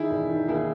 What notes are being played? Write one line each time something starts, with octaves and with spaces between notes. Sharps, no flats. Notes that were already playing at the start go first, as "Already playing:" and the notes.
Already playing: D#3 E4 G#4
E1
D#3
D#2 E4 G#4